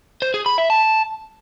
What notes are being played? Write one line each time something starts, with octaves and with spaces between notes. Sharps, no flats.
C5
G#4
B5
E5
A5